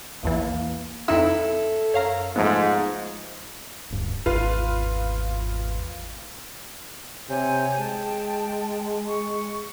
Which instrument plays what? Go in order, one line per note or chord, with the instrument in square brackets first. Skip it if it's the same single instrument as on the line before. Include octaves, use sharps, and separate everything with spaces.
[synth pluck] A#1 E2 E3 [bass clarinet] A#3
[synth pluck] F2 D#4 E6 [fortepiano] E4 [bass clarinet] A4
[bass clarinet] F#2 [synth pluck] C#5 F5 A#5
[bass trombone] G#2 [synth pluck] F3 A3 B3 [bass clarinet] F4
[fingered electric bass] D1 G2
[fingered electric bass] G#1 E2 [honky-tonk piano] F4 B4
[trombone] C3 [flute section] C#5 G#5 G6
[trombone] G#3 [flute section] G5 A5
[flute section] C#6